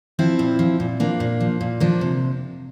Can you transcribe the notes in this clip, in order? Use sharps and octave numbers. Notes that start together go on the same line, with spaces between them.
F3 C4 E4
A#2
F3
A#2
F3 A#3 D4
A#2
F3
A#2
F3 A#3 D4
C3